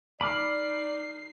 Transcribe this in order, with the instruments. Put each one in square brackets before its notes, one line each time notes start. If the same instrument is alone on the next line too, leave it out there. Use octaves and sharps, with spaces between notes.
[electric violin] D#4 C7 [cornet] D5 [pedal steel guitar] B5 D6 F6